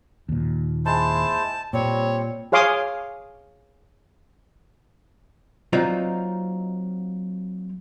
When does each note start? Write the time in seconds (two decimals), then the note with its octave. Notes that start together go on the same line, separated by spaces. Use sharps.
0.29 D#2 A#2
0.86 G#3 E4 C5 A5
1.73 A#2 G3 C4 C#5
2.52 G#4 C#5 F5 C6 D6 D#6
5.73 F#3 A#3 C4 D#4 F4 D5